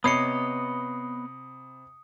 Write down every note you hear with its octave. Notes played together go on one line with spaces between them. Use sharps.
C3 B3 C#5 D#5 B5 D#6 C7 C#7